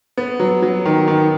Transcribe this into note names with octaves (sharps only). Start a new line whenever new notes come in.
B3
F#3
F#3
D#3
D#3